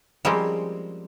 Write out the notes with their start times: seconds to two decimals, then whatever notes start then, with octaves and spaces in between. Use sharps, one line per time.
0.25 F3 G3 G#3 A#3 C4 C#4